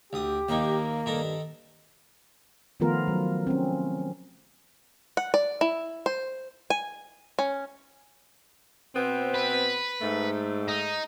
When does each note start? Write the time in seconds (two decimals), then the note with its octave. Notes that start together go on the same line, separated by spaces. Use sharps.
0.13 D2 G4 D#6
0.49 D#2 D#3 A#3
1.06 G2 D#3 A4 A#5
2.80 D#3 F3 A3 B3 F4 A#4
3.08 F#3
3.47 C4 C#4
5.17 F#5
5.34 D5
5.61 E4
6.06 C5
6.70 G#5
7.39 C#4
8.95 B2 B3 C4
9.34 B4
10.02 G#2 A3
10.68 D#4